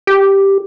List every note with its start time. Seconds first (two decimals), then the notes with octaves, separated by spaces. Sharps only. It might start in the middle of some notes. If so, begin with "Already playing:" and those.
0.07 G4